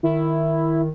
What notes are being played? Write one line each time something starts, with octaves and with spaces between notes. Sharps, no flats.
D#3 E4